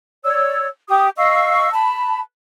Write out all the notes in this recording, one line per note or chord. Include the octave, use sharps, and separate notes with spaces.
C#5 D5 E6
G4 G5 D6 D#6
D#5 F5 C#6 E6
A5 B5